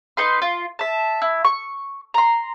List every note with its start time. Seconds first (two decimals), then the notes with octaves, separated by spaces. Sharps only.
0.17 D#4 B4 C6
0.42 F4
0.79 E5 A5
1.22 E4
1.44 C#6
2.14 A#5 C6